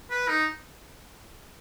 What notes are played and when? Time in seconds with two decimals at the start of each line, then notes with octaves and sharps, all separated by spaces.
0.10 B4
0.28 D#4